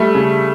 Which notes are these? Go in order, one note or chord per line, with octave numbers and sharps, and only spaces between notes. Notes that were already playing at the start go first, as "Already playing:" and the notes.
Already playing: G3 A3
C#3